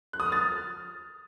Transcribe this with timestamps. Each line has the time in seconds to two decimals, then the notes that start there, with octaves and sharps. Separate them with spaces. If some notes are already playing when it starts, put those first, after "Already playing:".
0.13 F#6
0.20 D#6
0.26 F6
0.32 A6
0.38 F6